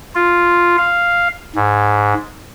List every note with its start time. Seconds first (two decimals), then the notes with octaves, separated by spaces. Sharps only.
0.15 F4
0.78 F5
1.56 G#2